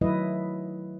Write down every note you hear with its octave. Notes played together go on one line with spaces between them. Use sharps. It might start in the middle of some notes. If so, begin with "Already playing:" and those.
D#3 F#3 A3 E4 B4 D#5